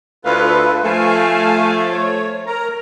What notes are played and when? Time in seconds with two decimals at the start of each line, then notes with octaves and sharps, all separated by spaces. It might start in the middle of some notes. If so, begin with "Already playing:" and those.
0.25 D2 E4 F4 A4 B4 F5
0.84 F3 A3 F5 G#5 A5
1.91 C#5
2.47 A#4 A#5